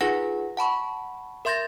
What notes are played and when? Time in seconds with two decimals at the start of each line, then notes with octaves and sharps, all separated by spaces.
0.01 D#4 F4 G#4 B4 F#5 A#6
0.57 F#5 A5 B5 C#6
1.45 A#4 E5 C6 G6 A6 A#6